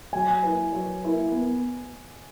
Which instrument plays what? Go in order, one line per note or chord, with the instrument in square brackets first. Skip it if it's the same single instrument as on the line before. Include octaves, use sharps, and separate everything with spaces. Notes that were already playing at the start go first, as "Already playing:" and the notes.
[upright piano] F#3 [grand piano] G#5
[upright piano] A#3 E4 B4
F#3
A#3 E4 B4
B3